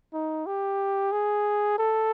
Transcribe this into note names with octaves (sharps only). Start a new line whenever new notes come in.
D#4
G4
G#4
A4